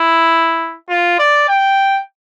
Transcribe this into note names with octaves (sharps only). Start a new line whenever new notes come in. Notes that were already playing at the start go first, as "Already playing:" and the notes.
Already playing: E4
F4
D5
G5